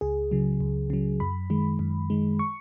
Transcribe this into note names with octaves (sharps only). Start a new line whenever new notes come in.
C#2 G#4
C#3 F#3
C#2
C#3 F#3
F#2 B5
D#3 G#3
F#2
D#3 G#3
C#6